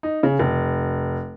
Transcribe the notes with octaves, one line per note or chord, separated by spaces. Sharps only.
D#4
C#3
F1